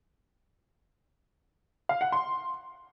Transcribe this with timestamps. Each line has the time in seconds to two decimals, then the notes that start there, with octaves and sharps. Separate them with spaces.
1.89 F5
2.01 F#5
2.12 C6